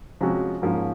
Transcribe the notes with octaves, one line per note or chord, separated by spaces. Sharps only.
C3 F3 G#3 C#4 F#4
G#2 F3 A#3 C#4